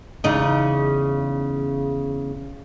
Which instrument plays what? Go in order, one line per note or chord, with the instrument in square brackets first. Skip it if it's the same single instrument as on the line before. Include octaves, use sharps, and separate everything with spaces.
[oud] E2 C#3 D#4